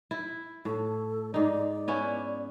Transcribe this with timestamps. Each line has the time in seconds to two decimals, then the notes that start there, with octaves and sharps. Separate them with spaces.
0.11 E4
0.65 A2 A4
1.34 G#2 D#4 D5
1.88 B3 C#4 E4